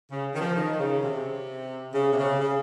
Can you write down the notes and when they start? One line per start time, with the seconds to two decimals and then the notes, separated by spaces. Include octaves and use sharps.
0.10 C#3
0.34 D#3
0.41 F3
0.57 D#3
0.79 C#3
1.03 C3
1.94 C#3
2.12 C3
2.18 C#3
2.41 C#3